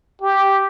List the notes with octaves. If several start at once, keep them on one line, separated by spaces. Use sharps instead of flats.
G4